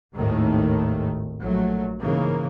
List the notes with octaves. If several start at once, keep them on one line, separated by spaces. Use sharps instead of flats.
G#1 D#2 A2 D#3 A3
A#1 F#3 A3
G#2 C#3 E3 A#3